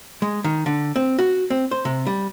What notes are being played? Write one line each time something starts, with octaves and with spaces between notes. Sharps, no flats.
G#3
D#3
D3
C4
F#4
C4
C5
C3
G3